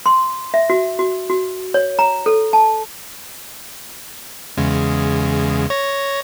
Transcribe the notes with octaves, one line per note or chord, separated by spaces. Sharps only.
C6
E5
F#4
F#4
F#4
C#5
A#5
A4
A5
E2 C#3 G#3
C#5 A#6